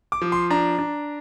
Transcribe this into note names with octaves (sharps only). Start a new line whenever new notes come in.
D6
F3
C6
D4 A#5
D4